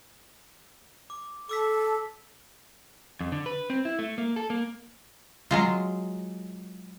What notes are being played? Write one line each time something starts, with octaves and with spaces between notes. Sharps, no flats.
D6
A4 D6 E6 B6
F2
D3
B4
C4
E4
A3
A#3
A4
A#3
F#3 G#3 F4